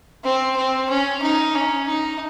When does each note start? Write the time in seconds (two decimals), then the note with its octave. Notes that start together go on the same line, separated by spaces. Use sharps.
0.24 C4
0.56 C4
0.89 C#4
1.22 D#4
1.55 C#4
1.88 D#4